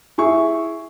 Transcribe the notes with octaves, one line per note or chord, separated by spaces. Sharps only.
E4 G#4 C#6